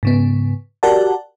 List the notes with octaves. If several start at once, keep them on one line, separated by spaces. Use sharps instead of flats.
G#2 C#3 B3
F#4 G4 A#4 D5 F#5 A5